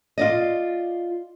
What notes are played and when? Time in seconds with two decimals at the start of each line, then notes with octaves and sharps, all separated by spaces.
0.18 F4 D5 D#5